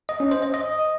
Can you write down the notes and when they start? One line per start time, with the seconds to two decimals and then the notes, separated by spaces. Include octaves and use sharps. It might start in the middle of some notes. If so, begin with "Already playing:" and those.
0.09 D#5
0.20 C#4
0.31 C5
0.43 D#5
0.54 D#5